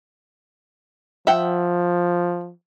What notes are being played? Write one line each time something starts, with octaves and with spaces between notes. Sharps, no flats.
F3 E5 F#5 G5